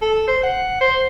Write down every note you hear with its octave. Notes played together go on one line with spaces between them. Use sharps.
A4
C5
F#5
C5